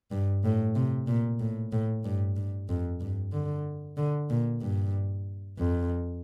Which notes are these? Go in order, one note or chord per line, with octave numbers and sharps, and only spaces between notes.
G2
A2
C3
A#2
A2
A2
G2
G2
F2
G2
D3
D3
A#2
G2
F2